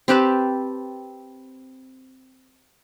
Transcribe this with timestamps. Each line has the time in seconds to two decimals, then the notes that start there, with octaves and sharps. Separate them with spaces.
0.08 C4 G4 B4 A5